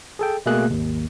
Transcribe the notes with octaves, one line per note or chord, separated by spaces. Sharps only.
G#4 A4 G5
B2 A3 A#3 G#4 F#6
G#1 D#2